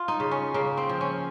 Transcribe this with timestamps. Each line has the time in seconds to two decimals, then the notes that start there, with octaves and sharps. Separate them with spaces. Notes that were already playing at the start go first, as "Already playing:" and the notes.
Already playing: F4
0.08 D#4
0.20 C#3
0.31 C#4
0.54 C#3 A#3
0.77 C4
0.89 F3
1.01 C#4